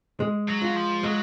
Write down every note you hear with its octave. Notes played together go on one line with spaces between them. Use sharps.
G#3
F#3
F4
F3
F#3 G#3